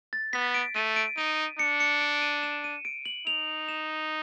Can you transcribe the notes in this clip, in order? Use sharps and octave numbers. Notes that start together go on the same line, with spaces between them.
A6
B3 B6
D7
A3 D#7
D7
D#4 D#7
D4 C#7
C#7
D7
D#7
E7
D#7
D7
F#7
D#4 F7
E7